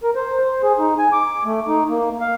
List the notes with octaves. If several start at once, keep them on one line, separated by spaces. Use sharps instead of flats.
A#4
C5
C5
G#4
D#4
G#5
D6
A3
D#4
A#3
F5